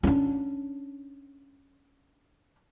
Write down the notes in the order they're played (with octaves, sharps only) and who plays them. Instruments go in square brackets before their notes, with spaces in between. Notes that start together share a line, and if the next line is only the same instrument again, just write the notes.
[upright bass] C#4 D4